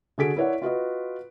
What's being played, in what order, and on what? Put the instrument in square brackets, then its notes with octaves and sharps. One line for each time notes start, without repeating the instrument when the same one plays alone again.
[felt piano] D3 F#4 G#4 A4 B6 D7
E4 A#4 C#5 D5 F#5
F4 F#4 B4 D#5